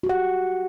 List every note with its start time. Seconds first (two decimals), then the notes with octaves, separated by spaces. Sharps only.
0.03 F#4
0.06 G4
0.09 F#5